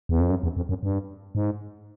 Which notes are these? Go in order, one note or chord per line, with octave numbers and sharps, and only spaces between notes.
E2
F2
F#2
E2
F2
F#2
G2
G#2